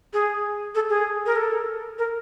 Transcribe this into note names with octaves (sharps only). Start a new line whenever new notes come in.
G#4
A4
G#4
A#4
A4
A#4